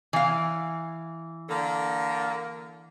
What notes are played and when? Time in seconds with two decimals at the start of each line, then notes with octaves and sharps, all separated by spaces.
0.13 E3 F5
1.49 D3 A#3